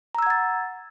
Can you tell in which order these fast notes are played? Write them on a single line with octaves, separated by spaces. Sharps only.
A#5 E6 G#6 F#5 A6